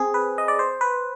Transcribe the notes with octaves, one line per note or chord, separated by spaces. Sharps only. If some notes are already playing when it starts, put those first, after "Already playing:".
Already playing: C4 G#4
B4
D#5
D5
C5
B4